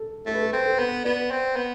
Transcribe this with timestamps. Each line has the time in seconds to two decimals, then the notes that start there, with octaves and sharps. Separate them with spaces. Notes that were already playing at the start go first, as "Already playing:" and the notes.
Already playing: A4
0.26 A3 A4
0.34 B4
0.41 A4
0.53 C4
0.66 A4
0.79 B3
1.04 B3 D5
1.31 C4
1.56 B3